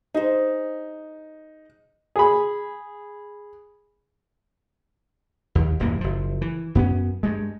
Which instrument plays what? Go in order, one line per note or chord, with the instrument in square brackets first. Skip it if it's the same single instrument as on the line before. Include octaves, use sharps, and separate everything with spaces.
[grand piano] D#4 [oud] G#4 C5
[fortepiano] G#4 B5
[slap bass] D#2
D#1 F#2 E3 A#3
F#1 F3
E3
F#2 B3 C#4
G2 G#3